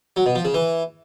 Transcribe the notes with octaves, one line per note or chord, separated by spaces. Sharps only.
F#3
B2
F3
C#3
E3